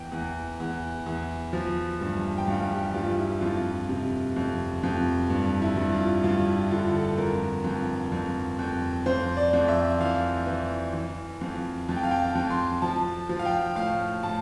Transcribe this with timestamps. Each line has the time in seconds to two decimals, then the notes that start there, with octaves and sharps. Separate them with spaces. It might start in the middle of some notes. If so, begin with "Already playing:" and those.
Already playing: E2 G5
0.12 E2
0.60 E2
1.06 E2
1.53 F3
2.01 G2
2.38 G5
2.47 G2 F5
2.71 G4
2.94 G2 F4
3.18 E4
3.41 F2 F4
3.89 C3
4.36 F2
4.83 F2
5.30 G2
5.62 E4
5.76 G2
5.92 F4
6.24 G2 F4
6.47 E4
6.71 D3 F4
6.94 A4
7.18 F2 A#4
7.64 F2
8.12 F2
8.59 F2
9.06 F2 C5
9.37 D5
9.53 F2
9.68 E5
10.00 E3 F5
10.46 E3
10.93 E3
11.41 F2
11.88 F2 A5
11.96 G5
12.03 F5
12.11 G5
12.19 A5
12.35 F2
12.50 C6
12.82 F3 A5
13.29 F3
13.39 F5
13.45 G5
13.76 A2 F5
14.23 A2 A5